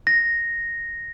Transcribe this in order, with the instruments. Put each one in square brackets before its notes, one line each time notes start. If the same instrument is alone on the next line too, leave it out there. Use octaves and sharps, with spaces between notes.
[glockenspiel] A#6